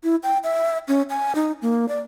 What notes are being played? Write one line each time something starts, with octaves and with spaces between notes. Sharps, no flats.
E4
G5
E5
C#4
G#5
D#4
A#3
D5